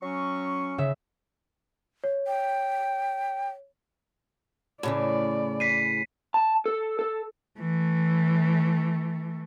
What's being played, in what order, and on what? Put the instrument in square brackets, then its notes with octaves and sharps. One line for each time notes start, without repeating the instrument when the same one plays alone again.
[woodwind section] F#3 C#4 C#6
[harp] C#3 E5
[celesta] C#5
[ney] G5
[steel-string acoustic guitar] A2 C#3 E3 [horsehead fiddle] D5
[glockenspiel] B6 C7 D#7
[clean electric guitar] A5
A4
A4
[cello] E3 A3